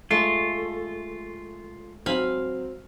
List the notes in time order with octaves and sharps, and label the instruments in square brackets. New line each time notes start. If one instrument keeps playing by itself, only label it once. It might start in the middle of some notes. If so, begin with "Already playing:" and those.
[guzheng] G#3 A3 [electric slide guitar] F4
[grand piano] F#3 C4 [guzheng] F5 G#5 B5